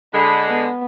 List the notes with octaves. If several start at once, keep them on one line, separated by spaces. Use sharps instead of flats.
D3 G#3 B5
B3